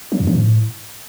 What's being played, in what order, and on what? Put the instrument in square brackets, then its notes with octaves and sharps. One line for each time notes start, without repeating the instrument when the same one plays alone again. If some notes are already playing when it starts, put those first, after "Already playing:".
[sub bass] F#3
F#2
F3
A2